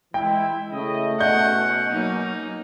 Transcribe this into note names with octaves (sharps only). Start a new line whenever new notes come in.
E3 G#3 E4 G5
C#3 A3 E4 D#5
B2 C#4 D#5 F#5 G6
F#3 A#3 D#4